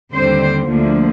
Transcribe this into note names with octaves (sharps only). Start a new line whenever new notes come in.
D#2 D3 G3 C4 C5
D2 D3 F3 A#3